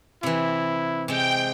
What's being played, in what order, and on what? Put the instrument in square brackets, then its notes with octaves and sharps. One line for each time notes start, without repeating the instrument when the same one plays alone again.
[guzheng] C3 E3 [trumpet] E4
[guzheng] C3 G#3 [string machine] G5